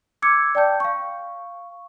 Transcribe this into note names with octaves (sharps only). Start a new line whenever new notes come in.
D6 E6 G#6 C#7
D5 G5 A5 G6
F5 C#6